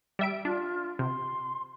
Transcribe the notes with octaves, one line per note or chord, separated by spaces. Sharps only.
G3 E5 D7
D4 F4
C3 C6